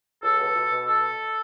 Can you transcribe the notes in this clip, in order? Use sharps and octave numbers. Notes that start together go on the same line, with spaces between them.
C#2 A4
B2
B2
B2
A4